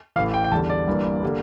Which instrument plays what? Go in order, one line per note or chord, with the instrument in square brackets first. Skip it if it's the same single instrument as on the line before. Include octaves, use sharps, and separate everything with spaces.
[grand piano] A1 A2 E3 F5
G5
G5
E2 D3 G3 A5
D5
G1 G2 E3 A#3
D3 G3 A#3